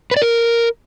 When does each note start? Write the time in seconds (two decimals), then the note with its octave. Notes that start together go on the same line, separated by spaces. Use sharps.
0.11 B4
0.17 D5
0.22 A#4